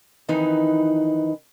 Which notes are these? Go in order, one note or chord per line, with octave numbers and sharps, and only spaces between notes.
F2 D#3 E3 D#4 B4